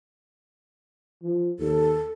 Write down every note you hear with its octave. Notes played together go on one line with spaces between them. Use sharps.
F3
D#2 A4